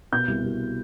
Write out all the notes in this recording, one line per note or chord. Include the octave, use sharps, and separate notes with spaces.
B2 G6
C2
C2